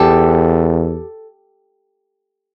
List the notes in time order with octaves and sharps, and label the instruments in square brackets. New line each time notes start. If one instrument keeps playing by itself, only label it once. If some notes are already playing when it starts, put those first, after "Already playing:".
Already playing: [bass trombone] E2 [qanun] G4 A4